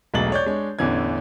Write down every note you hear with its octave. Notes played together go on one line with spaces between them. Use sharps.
E1 B1 A3 B3 A6 F#7
C#5 D5 G6
G#3 D4 C#5
A1 E2 D3 E3 C#4 G#6